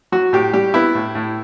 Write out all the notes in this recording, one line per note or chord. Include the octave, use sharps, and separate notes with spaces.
F#3 F#4
A2 G4
G3 G4
B3 E4
A2
A2